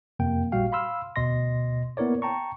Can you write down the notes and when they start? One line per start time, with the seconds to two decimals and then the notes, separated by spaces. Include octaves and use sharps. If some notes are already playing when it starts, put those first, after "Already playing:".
0.19 F2 C3 A#3 G5
0.52 A1 A#2 G3 F#4 F5 G5
0.72 F5 B5 C6 E6 F6
1.16 D2 B2 D#5 C6 A#6
1.97 A#3 B3 E4 A#4 C#5 D5
2.22 G5 A5 A#5 C#6